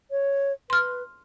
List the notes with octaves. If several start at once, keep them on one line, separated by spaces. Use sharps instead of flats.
C#5
B4 C6 F6